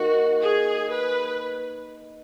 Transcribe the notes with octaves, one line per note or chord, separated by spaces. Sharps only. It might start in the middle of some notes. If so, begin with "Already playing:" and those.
Already playing: D#3 A#3 D#4 F#4
G#4
B4